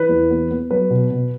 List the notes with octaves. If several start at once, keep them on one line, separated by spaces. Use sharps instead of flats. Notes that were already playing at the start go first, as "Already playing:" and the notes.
Already playing: E3 B4
E2
B3
B3
F#3 B4
B2
B2